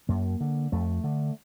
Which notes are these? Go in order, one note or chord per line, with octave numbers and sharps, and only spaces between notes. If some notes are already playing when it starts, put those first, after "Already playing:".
F#2 A#3
D3
F2 A3
D3